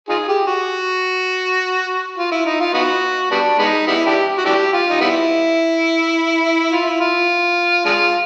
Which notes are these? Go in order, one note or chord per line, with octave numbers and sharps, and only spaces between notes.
D#4 F4 G#4
G4
F#4
F4
E4
D#4
F4
B3 D#4 F#4
G3 B3 D4
G#3 B3 D#4
G3 B3 E4
D4 E4 G4
F#4
D4 E4 G4
F4
D#4
G3 B3 E4
F4
E4
F4
G#3 D4 F4